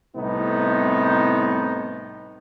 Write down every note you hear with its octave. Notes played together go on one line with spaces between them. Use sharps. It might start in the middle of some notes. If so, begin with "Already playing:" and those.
C2 A2 C3 B3 D#4